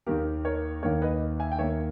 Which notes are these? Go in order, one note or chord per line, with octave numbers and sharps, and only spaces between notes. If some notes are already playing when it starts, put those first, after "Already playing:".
D#2 D#3 A#3 G4 A#4
A#4 C#5
D#2 D#3 A#3 A#4 C#5
B4 D#5
E5 G#5
G5
D#2 D#3 A#3 C#5 E5